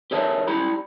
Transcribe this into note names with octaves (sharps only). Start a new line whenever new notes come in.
G4 G#4 A#4 C#5 E5 A5
G3 E4 G4 A#5 B5